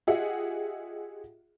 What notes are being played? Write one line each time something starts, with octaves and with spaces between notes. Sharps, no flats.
F4 G4 G#4 D#5 E5 F#5